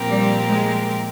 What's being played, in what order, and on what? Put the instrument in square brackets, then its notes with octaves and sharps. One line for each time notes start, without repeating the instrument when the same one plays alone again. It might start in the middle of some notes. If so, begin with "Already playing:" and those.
Already playing: [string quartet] A#2 F3 C4 G4 A#4
[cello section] G3
G#3